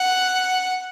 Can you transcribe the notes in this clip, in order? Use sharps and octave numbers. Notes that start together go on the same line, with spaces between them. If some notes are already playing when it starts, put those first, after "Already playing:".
Already playing: F#5